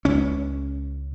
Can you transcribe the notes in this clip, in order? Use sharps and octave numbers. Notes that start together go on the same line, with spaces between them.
C#2 C#4